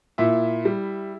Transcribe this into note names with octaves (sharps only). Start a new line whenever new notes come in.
A#2 E4 E5
G3